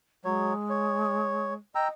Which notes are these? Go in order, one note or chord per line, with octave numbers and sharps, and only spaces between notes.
F#3 G#3 C#5
C#5
D#5 G5 A#5 E6